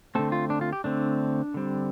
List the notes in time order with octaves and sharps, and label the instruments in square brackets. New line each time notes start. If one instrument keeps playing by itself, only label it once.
[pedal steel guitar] D3 A3 C4 A4
F4
D4
F4
G4
D3 A3 C4 D4
D3 G3 C4